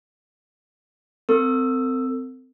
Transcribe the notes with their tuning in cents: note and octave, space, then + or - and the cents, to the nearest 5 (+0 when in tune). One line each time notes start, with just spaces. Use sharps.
C4 -25 A4 +45 E6 +10